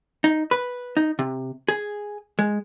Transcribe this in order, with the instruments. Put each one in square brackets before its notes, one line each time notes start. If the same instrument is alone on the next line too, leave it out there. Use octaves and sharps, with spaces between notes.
[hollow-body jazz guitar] D#4
B4
D#4
C3
G#4
G#3